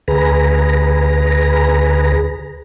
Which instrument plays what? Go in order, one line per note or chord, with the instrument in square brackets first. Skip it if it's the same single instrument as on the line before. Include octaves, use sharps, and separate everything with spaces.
[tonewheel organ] D2 G#4 B4 A#5